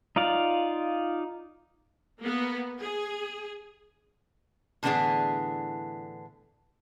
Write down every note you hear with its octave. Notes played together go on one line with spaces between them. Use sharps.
D#4 F4 D5 F5
A#3 B3
G#4
A2 D3 E3 B3 D4 G#4